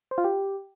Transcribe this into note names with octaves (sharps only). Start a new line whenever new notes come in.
C5
F4
G4